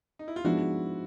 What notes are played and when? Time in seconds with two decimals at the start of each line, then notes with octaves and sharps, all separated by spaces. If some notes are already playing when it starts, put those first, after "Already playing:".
0.19 D#4
0.28 E4
0.36 F4
0.44 G#2 F3 G#3 B3 D4 E4 F#4